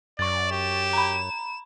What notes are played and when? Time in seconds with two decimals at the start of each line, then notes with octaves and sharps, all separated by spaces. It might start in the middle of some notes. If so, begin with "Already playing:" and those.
0.19 F#2 D5 C#6 A6
0.51 G4 E7
0.93 A#5 B5